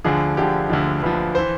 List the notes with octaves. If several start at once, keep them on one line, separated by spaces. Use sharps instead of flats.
D2 D3 F3 G#4
D2 D3 F3 G4
D2 D3 F3
D2 D3 F3 B4
E3 C5